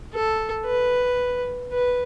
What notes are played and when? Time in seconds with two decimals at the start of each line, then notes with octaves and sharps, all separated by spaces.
0.14 A4
0.66 B4
1.73 B4